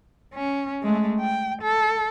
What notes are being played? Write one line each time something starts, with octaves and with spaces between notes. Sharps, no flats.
C#4
G#3 A3
G5
A4